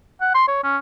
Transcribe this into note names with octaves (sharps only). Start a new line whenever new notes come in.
F#5
C6
C#5
C#4